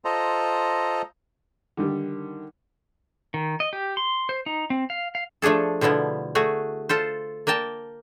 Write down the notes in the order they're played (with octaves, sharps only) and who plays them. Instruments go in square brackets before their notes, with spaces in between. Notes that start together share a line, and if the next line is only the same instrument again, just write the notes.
[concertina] F4 A4 C5 D#5 A#5
[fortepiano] D3 D#3 G3
[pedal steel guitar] D#3
D#5
G4
C6
C5
D#4
C4
F5
F5
[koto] F3 A3 D4 G#4 A4
B2 D3 F3 B3 E4
A3 F#4 G#4
F4 A4 C5
A#3 A#4 G5 A5